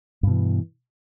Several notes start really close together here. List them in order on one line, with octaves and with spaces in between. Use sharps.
G2 B2 E3